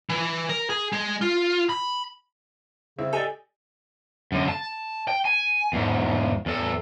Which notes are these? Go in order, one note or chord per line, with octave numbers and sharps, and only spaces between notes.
E3
A#4
G#4
G#3
F4
B5
C#3 C4 E4 E5
G4 A4 D5 D#5 G#5
F#2 D3
A5
G5
G#5
E2 G#2
E2 A4